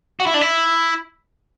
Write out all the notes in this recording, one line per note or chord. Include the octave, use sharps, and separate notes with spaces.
F#4
E4
D4
E4